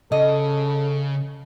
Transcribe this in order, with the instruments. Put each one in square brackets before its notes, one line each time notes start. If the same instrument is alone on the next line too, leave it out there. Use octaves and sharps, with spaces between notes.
[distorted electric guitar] C#3 [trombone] A4 [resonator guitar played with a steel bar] D#5